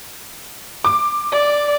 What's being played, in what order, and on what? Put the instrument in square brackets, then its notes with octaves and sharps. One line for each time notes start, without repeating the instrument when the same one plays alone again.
[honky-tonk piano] D6
[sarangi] D5